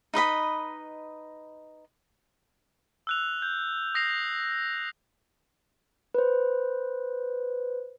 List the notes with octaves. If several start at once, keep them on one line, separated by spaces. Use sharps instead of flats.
D#4 B4 D#5 B5
E6 F#6 F7
G6
D#6 A#6 C7 F7
B4 C5